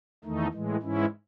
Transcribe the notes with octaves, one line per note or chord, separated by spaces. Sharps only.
E2 D#3 A3 D#4
A2 E3 G#3
G#2 E3 G#3 C#4 E4